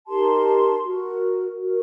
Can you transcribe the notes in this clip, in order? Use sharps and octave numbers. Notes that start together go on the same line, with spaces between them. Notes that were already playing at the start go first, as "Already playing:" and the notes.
D#4 G4 A#4 A5 C6
F#4 A#4
F#4 A#4